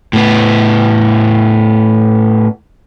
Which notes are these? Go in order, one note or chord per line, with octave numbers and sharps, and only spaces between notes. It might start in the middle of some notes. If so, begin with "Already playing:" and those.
A2 B3